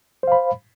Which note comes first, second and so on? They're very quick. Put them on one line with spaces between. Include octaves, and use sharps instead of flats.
C5 F5 B5